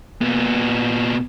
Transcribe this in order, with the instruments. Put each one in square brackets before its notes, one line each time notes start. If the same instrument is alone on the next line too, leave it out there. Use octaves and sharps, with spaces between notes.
[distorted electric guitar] A#2 B3